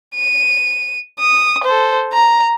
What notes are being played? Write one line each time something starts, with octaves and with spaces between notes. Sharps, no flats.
D#7
D#6
A4 C5
A#5